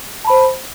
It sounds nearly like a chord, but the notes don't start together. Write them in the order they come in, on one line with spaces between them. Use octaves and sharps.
A5 B5 C5